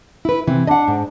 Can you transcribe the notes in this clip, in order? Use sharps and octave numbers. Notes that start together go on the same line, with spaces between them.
E4 B4
C3 E3 C4
D4 D#5 F#5
G#2